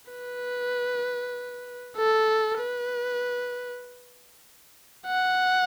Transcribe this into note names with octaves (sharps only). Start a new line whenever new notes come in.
B4
A4
B4
F#5